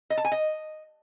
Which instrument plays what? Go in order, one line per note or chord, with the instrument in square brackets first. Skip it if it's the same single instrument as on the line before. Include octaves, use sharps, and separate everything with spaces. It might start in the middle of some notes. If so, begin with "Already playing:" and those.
[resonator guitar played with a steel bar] D#5
A5
G#5
D#5